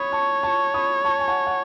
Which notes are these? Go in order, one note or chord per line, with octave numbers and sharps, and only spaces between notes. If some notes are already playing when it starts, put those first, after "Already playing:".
Already playing: C#5 B5 C#6 D#6
A5 C#6
A5 C#6
B5 D#6
A5 C#6
G#5
F#5 A5
F#5